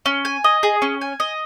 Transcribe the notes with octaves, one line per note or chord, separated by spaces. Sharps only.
C#4
G#5
D#5
G#4
C#4
G#5
D#5